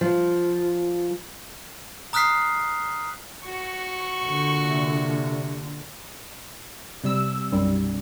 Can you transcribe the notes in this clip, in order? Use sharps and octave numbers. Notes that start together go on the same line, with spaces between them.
F3
A#5 D#6 F6 F#6 B6 C7
F#4 C#6
A#2 D3
C3
C3 G3 E6
B1 F#2 G3